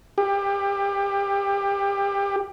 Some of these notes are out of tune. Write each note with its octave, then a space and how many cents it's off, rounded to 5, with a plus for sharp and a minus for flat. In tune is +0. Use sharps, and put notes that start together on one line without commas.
G4 +25